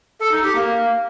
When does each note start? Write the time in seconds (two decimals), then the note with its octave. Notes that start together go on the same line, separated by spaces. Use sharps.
0.20 A4
0.32 D#4
0.44 G4
0.55 A#3